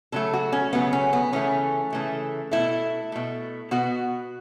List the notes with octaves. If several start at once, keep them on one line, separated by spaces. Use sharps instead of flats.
C#3 F#3 A3 A4
F#4
C#4
C#3 F#3 A3 B3
C#4
B3
C#3 E3 A3 C#4
C#3 E3 A3
B2 A3 E4
B2 A3
B2 B3 F#4